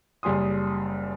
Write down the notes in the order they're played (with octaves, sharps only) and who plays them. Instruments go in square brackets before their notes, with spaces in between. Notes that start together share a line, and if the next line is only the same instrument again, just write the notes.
[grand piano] F#1 G3 G#4 C6 D#6